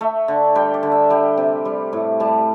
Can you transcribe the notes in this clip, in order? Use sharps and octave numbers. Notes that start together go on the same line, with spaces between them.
A3 E5
D3
G3 G5
D5
D3
E5
G3 G5
C3
G3
A2
G3 A5